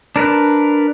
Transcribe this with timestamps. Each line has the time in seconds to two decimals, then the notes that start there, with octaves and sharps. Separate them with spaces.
0.16 D4 A#4 B4